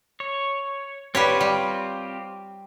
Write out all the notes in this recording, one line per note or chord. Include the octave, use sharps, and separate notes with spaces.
C#5
G3 C4 F4 G4 B4 C#5
G3